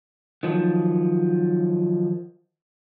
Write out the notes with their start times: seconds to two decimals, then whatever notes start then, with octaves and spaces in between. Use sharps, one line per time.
0.43 D#3 F3 F#3